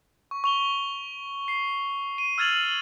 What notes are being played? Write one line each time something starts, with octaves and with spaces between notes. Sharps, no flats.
C#6
C#6 F7 G7
C7
D#7
E6 F6 G#6 A6 F7 F#7